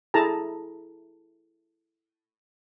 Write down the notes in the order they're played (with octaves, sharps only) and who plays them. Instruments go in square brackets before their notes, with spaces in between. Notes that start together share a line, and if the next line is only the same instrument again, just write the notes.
[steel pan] E4 G#4 A4 A5 A#5